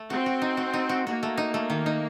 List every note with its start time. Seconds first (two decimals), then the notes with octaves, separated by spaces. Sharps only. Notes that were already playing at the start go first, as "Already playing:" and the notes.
Already playing: A3
0.10 C4 F#4
0.26 F#4
0.42 D#4
0.57 F#4
0.74 D#4
0.89 F#4
1.06 A#3 F#4
1.23 A3
1.38 D#4
1.54 A3
1.70 D#3
1.86 D#4